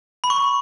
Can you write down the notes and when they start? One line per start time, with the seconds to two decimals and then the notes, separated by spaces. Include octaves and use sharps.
0.24 B5
0.30 C#6